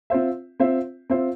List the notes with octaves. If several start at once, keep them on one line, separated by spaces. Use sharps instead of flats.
C4 F4 C5 E5
C4 F4 C5 E5
C4 F4 C5 E5